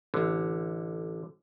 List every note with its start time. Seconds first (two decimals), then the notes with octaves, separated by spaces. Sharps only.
0.14 A1 D3